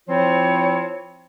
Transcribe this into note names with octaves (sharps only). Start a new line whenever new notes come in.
F3 C4 E4 F4 C5 C#5